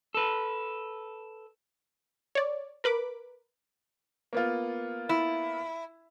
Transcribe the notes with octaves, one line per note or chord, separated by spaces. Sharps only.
A4 B4
C#5 D5
A#4 B4 B5 D6
A#3 B3 F4
E4